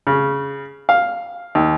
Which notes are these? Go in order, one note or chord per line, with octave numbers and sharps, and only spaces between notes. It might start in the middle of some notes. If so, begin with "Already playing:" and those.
C#3
F5
D#2